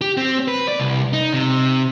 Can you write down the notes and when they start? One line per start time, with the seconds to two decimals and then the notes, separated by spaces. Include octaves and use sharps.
0.01 G4
0.17 C4
0.48 B4
0.68 D5
0.80 C2
1.13 D#4
1.33 C3